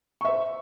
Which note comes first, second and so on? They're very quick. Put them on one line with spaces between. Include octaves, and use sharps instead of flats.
C#6 E5 C5